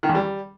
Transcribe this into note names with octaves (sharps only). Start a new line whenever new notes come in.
D#3
E2
G3